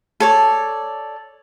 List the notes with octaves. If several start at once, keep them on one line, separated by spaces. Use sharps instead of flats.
A4 C#5 D5